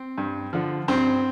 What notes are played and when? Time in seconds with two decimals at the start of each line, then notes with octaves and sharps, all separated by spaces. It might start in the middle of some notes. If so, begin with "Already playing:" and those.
Already playing: C4
0.18 G2
0.53 D3 F3
0.88 G2 C4